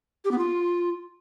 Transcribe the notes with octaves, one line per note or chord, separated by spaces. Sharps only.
G4
B3
F4